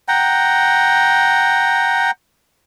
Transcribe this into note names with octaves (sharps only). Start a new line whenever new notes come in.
F#5 G5 A#5